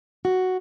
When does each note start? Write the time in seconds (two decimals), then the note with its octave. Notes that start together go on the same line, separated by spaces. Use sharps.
0.25 F#4